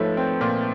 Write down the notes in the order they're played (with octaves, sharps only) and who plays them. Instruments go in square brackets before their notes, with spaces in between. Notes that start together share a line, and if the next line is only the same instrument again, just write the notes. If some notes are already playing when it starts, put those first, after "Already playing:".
Already playing: [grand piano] G#2 F3 A3 [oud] B4 C#5
[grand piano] C4
A#2